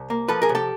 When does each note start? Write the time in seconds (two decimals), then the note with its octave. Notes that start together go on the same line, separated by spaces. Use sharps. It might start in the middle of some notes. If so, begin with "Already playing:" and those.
Already playing: C2
0.10 A#3
0.29 F3 A4 B4
0.42 G#4 A#4
0.49 C3
0.55 G4 A4